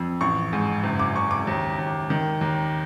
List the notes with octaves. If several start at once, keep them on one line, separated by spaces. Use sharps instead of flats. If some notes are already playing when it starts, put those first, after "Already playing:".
Already playing: F2
A1 C#6
G#2
F#1
D6
F#1 C#6
D6
D#2
D#2
D#3
D#2